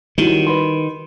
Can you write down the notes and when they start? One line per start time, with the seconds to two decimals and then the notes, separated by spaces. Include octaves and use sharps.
0.18 D#3 F#3 G3 E4
0.46 B4 B5 C6